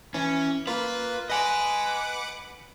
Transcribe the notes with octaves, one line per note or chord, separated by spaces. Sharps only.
E3 C#4
A#3 F4 B4
B4 D#5 F#5 G#5 D6